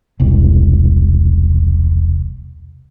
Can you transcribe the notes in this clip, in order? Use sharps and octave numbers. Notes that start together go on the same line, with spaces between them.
E1 C2